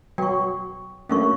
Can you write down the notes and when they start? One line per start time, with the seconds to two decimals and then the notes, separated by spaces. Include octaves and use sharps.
0.18 F#3 G5 C#6
1.09 F#3 A3 A#3 C#4 D4 C#6